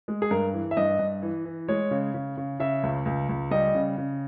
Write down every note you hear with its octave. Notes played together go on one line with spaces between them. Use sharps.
G#3
G#4
G2 A#4
E3
E5
G2 D#5
G2
E3
E3
G#3 C#5
C#3
C#3
C#3
C#3 E5
C#2
C#2
C#2
G3 D#5
C#3
C#3